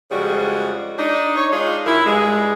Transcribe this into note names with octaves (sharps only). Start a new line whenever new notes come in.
F2 C#3 G3 G#3 F#4
D4 D#4
C#5
G#3 D4 D#4 F4
F#2 D#3 E4
G2 G#3